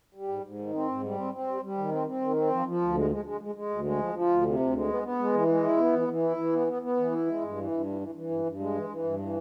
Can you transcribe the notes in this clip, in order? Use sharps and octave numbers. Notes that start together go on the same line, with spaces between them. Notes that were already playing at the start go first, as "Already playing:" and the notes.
G3
G#2
G#2
D#3
C4
G#2
G3
C4
C4
G3
G3
D#3
C4
C4
D#3
C4
F3
F3
D2
G#3
G#3
G#3
G#3
G#3
D2
G#3
F3
F3
D2
C3
D2
G#3
B3
B3
G#3
E3
G#3
E4
B3
E3
E3
E4
E3
B3
B3
B3
E3
E4
G#3
G2
E3
G2
E3
E3
E3
G2
G2
G#3
E3
E3
G2
E3